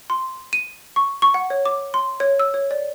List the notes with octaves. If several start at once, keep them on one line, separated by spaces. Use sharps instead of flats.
C6
D#7
C#6
C#6
F#5
C#5
D6
C6
C#5
E6
C#5
D5